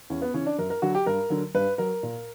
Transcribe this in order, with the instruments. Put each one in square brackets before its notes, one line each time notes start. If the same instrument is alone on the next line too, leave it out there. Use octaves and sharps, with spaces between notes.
[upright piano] E2 C#4
B3
C#3 E3 C#4
D4
F#2 A#4
A#4
D3 F#3 F#4
G4
G2 A#4
D3 F#3
G2 B4
F#3 A#4
A#2